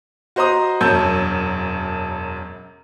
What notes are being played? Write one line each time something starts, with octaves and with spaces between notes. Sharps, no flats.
F#4 C5 D#5 A#5 D#6
E1 F#2 C#4 A5 E6 G6